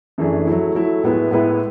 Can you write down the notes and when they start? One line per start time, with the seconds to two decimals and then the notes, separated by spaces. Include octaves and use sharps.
0.18 F#2 E3 A3 D4 G#4
0.47 F#3 A3 E4
0.75 F#3 A3 E4
1.03 A2 G#3 B3 E4 B4
1.31 A2 G#3 B3 E4 B4